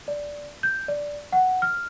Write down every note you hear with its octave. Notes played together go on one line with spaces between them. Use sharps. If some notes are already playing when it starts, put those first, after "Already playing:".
D5
G6
D5
F#5
F6